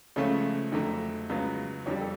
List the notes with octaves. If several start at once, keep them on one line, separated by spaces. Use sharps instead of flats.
C#2 C#3 F3 A3 C#4 C#5
F2 D3 F#3 A3
C#2 C#3 F#3 B3
F2 D3 G3 C#5
A4